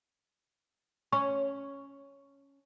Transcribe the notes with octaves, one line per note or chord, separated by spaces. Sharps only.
C#4 C#6